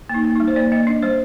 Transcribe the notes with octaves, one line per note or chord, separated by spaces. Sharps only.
A#3 D#4
A#3
G3 D#4
C5
A#3 D5
A#3 D#5
D4 D#5
G3 C5